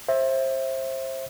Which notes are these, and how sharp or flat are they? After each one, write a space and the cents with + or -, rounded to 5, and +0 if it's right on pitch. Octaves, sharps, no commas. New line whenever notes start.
C5 +30 E5 +0